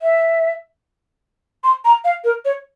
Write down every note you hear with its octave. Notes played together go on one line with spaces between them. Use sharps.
E5
C6
A#5
F5
A#4
C#5